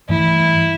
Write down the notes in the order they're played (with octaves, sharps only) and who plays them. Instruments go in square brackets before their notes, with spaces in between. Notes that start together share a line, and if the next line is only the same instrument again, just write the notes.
[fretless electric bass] G2 E3 A3 [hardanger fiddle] E4